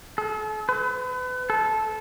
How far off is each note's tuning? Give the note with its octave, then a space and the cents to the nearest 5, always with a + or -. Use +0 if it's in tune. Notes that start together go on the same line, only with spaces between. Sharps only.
A4 -40
B4 +35
A4 -15